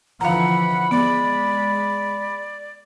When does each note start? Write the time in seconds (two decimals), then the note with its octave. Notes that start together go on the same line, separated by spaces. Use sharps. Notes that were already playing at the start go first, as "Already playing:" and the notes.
0.21 D3 E3 F3 F5 F#5 A#5 B5
0.91 G#3 B3 D5